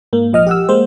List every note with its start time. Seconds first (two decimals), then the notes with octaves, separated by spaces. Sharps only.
0.13 G#2 A#3
0.33 A#1 F3 D#5 D#6 F6
0.47 G4 F#5 E6
0.69 G#3 A#3 C5